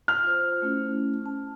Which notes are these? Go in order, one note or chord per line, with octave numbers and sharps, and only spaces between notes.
F6
F4 C5
A3 C#4 E4
A5